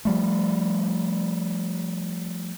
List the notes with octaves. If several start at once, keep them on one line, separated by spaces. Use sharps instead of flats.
F3 G3 A3